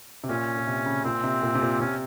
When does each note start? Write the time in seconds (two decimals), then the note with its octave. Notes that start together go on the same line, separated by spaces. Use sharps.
0.24 C3
0.29 A#2 C#4
0.57 A#2
0.67 C3
0.86 C#3
1.05 A#2 C4
1.24 C3
1.42 A#2
1.55 C3
1.62 A#2
1.80 C3 C#4